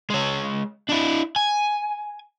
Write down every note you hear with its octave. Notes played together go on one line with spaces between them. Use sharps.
G#3 C#5
D4 E4
G#5